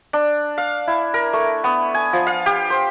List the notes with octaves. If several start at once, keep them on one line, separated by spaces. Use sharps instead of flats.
D4
F5
E4
A#4
A3
B3
G#5
F3
F5
G4
C5